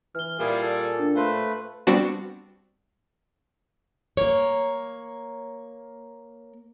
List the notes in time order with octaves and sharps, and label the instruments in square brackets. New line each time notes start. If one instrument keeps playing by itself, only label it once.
[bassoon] E3 [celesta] F6 G7
[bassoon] A#2 [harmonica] G3 F4 G#4 [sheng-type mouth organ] E4
[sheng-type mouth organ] A4
[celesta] D4
[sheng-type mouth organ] A3 B4 [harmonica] C5 [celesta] F5 C6
[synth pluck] G3 B3 C4 D4 F#4
[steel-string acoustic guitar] A#3 C#5